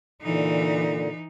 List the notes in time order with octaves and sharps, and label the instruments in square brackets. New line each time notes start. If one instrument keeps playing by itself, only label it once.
[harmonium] A#2 D3 [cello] E3 D#4